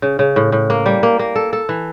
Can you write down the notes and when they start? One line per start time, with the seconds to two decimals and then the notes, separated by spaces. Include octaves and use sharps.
0.02 C#3
0.19 C#3
0.36 A2
0.52 A2
0.70 A#3
0.86 G3
1.03 A#3
1.19 A#3
1.36 A4
1.53 A4
1.69 E3